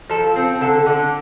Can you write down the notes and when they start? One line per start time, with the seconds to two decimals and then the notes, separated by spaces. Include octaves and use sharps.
0.10 F3 A4
0.36 C4
0.61 D3 A4
0.86 D3